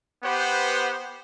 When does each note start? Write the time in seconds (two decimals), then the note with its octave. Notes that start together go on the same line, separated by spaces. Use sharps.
0.23 B3 G4 B4 C5 F#5